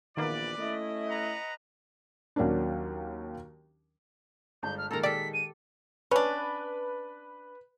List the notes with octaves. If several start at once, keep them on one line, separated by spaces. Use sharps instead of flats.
A#1 D#3 E3 A#3 B3 B4 D5
A3 C#4 E4 D#5
B4 F#5 A#5
D#2 F#3 A#3 C#4 D4
G1 G#3 A5 G6
F6
A#2 D#3 G#3 A4 A#4 A#5
G4 A4 D5 B6
D#7
C#4 D4 B4